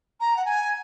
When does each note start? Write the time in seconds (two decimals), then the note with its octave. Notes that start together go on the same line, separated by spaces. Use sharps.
0.20 A#5
0.36 F#5
0.45 G#5